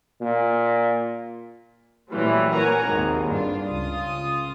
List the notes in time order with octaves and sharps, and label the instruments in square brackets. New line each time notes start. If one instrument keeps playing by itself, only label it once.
[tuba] A#2
[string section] A#2 E3 F#3 G3 A3 C4
A#4 C#5 F#5 G#5 A#5
G#1 D#2 C3
G2 D4 F4
C#2 F4 D#6